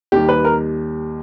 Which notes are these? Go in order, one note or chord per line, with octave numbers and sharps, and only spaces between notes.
D#2 D#3 G3 G4
B4
A#4